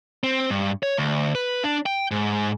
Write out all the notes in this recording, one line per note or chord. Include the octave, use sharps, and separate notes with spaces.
C4
G2
C#5
D2
B4
D4
G5
G#2